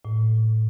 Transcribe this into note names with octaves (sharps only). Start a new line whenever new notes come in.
A2